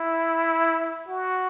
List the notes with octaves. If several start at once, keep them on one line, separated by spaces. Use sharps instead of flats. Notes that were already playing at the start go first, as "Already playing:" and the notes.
Already playing: E4
F#4